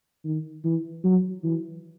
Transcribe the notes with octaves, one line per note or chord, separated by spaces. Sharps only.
D#3
E3
F#3
E3